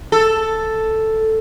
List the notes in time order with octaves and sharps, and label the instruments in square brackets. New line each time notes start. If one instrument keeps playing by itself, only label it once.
[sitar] A4